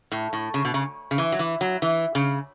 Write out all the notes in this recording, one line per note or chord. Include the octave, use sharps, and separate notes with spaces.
A2
A2
C#3
B2
C#3
C#3
E3
F#3
E3
F#3
E3
C#3